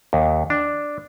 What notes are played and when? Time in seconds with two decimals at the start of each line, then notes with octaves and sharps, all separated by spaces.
0.13 D#2
0.50 D4